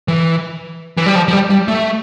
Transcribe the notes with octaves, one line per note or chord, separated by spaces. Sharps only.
E3
E3
G3
F3
F3
G3
G3
A3